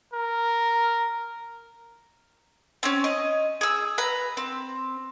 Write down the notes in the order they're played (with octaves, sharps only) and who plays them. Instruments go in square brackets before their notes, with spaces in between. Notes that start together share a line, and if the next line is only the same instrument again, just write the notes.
[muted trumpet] A#4
[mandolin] C4 C#4
D#5
G#4 E6
B4 A#5
C4